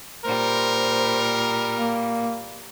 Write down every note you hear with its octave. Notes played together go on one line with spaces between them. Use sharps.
A#2 G3 A#4 C5
A#3